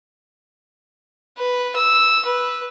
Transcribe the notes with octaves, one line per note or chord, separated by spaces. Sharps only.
B4
E6
B4